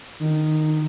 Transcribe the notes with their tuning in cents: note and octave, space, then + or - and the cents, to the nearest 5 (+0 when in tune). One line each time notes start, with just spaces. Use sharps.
D#3 -10